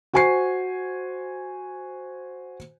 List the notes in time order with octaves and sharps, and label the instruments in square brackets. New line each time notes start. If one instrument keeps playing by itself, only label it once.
[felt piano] F#4 C5 G#5 C#6 C7